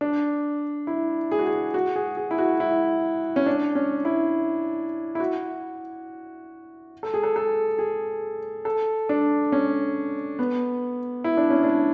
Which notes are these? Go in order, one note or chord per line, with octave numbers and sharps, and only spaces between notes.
D4
E4
G#4
F#4
G#4
F#4
G#4
G#4
E4
F#4
E4
C#4
D4
C#4
E4
E4
F#4
A4
G#4
A4
A4
G#4
A4
D4
C#4
B3
E4
D4
C#4
D4